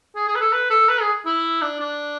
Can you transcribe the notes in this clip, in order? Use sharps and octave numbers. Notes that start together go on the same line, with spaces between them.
G#4
G#4
B4
A4
B4
A4
B4
G#4
E4
D4
D4